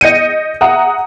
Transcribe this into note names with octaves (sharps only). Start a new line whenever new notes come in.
D#5 G6 C#7 D#7
E5 F#5 A#5 D#6